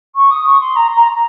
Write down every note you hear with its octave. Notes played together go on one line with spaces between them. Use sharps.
C#6
D#6
C#6
C6
A#5
A#5